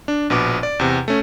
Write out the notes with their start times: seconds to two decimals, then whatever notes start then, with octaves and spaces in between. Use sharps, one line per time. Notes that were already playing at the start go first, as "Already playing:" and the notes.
0.08 D4
0.30 A#1 B2 B3 D6
0.63 D5
0.79 E2 C3
1.08 A3 C#4